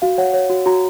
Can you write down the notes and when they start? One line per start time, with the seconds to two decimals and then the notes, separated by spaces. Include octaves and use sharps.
0.02 F#4 F5
0.18 C#5 F#5
0.33 C#5
0.50 F#4
0.66 F#4 A#5